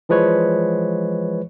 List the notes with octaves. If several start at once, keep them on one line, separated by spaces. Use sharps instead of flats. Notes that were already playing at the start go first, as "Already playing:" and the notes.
E3 F3 G#3 B4 C#5